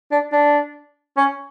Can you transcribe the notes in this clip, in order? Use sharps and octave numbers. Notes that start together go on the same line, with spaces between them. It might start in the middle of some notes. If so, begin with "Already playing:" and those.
D4
D4
C#4